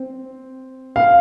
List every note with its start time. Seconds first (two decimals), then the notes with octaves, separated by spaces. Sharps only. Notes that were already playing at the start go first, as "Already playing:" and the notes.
Already playing: C4
0.96 F5